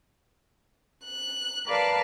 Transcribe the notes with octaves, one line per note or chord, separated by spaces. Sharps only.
F#6
A#4 B4 D5 F5 A5